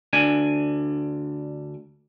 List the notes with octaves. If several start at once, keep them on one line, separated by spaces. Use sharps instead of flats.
D2 D4 G#5